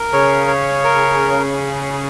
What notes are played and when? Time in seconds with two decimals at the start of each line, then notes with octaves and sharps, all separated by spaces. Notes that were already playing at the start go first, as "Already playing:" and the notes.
Already playing: A#4
0.12 C#3 C#5
0.48 C#5
0.84 A#4